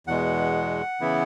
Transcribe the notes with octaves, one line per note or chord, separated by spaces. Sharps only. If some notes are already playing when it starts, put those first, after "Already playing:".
E2 B2 G#3 F#5
C#3 E3 B3 E4